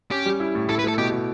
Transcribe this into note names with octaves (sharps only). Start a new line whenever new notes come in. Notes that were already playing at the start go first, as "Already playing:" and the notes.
C#4 G4
G3
E4
A2
E4 A4
B4
A3 A4
B2 G4
B2